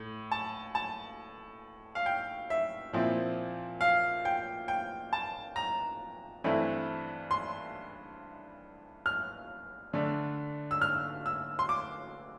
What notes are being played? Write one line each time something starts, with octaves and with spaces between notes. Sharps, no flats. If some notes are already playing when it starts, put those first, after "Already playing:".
Already playing: A2
A5
A5
F5
G5
E5
A#2 F3 C4 E4
F5
G5
G5
A5
A#5
G2 E3 A3 C4 E4
C6
F6
D3 A3 D4
E6
F6
E6
C6
D6